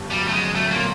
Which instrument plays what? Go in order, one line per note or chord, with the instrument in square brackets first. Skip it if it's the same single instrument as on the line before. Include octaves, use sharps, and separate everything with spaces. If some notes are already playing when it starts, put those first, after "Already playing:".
Already playing: [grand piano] G1 G2
[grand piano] F#2 [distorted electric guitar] G3
[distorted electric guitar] A3
[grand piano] F#2 [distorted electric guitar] G#3
[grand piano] F#2 [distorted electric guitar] A3
[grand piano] A2 [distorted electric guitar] A#3
[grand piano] A#2